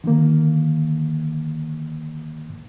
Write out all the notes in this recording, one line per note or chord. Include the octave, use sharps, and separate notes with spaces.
D3 D#3 A#3